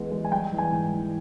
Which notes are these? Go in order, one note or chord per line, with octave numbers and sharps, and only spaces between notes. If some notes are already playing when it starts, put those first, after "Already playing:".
Already playing: E3 G#3 B3
G#3
G#5
G3 G5
E3
G#5
G#2
E3